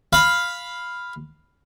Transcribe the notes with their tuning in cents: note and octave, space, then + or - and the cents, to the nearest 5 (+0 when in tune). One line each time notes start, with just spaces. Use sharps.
F5 +0 B5 +0